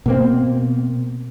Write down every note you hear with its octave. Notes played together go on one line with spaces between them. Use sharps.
B2 A#3 C4